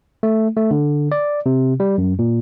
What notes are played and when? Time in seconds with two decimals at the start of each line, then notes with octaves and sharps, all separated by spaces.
0.23 A3
0.57 A3
0.71 D3
1.12 D5
1.46 C3
1.80 G3
1.98 F#2
2.19 A#2